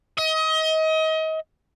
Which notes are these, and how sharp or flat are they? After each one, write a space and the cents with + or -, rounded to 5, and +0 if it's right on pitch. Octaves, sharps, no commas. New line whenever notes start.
D#5 +30